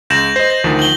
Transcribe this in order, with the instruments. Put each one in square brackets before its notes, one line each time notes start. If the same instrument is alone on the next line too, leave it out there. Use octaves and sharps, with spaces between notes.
[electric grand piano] C#2 E7 [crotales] G6 A#6 F#7
[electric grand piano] C5 D#5
[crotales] A#6
[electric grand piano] D2 D#3 F3
[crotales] F#7 G7